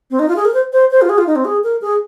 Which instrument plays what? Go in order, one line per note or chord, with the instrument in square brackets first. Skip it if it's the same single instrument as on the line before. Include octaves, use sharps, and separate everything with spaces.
[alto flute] C4
D#4
F4
G#4
A#4
C5
C5
C5
F4
G#4
F4
D#4
C4
G#4
A#4
G#4